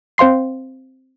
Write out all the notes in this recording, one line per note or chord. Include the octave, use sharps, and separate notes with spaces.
C4 C5 F5 C6 C7